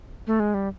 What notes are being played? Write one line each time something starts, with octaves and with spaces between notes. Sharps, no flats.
A3
G#3
G3